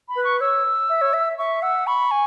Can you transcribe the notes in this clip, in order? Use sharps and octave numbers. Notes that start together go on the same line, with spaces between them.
B5
B4
C#6
C#5 E6
E5
C#5
E5
E5 C#6
F#5 E6
B5 C#6
G#5